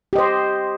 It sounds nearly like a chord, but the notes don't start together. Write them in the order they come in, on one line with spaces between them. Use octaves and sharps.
G4 D#5 C5